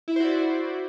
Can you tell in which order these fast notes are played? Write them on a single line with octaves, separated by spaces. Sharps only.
E4 E5 C5 F#4 D5